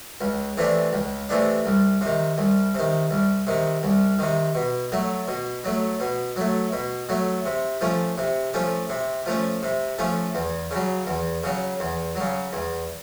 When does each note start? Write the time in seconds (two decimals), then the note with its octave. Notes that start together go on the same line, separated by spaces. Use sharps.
0.21 C#2
0.57 C3 E3 A3 D4
0.93 C#2
1.29 C3 E3 A3 D4
1.66 C2
2.01 C3 D#3
2.38 C2
2.75 C3 D#3
3.11 C2
3.47 C3 D#3
3.83 C2
4.19 C3 D#3
4.55 B2
4.92 F#3 A3
5.28 B2
5.64 F#3 A3
6.00 B2
6.36 F#3 A3
6.72 B2
7.09 F#3 A3
7.46 C3
7.81 F3 A3 C#4
8.18 C3
8.54 F3 A3 C#4
8.90 C3
9.26 F3 A3 C#4
9.63 C3
9.98 F3 A3 C#4
10.35 E2
10.71 C#3 F#3
11.07 E2
11.44 C#3 F#3
11.80 E2
12.16 F#3
12.21 C#3
12.53 E2